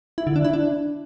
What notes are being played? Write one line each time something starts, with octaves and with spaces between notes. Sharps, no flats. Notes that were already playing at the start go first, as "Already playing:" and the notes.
E4
D3
D4
E4
D4